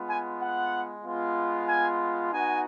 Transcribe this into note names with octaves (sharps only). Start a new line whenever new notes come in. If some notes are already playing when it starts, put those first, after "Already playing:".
Already playing: G#3 B3 F4
G#5
F#5
G#3 B3 F4
G#5
B3 D#4 F#4 G#5